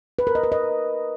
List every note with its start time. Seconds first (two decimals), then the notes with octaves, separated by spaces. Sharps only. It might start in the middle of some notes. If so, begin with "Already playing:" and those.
0.19 B4
0.27 A#4
0.35 D#5
0.43 B4
0.52 D#5